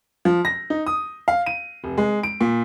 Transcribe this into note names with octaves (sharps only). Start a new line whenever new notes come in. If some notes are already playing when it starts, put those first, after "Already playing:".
F3
A#6
D#4
D#6
F5
D#7
F1
G#3
D7
A#2